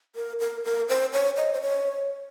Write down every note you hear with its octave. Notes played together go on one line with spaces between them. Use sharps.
A#4
A#4
A#4
C5
C#5
D#5
C5
C#5